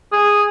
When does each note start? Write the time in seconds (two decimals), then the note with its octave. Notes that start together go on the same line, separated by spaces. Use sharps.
0.12 G#4